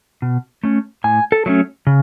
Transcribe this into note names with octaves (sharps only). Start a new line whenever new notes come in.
B2
A3 C#4
A2 G#5
A4
F#3 A3 C#4
C#3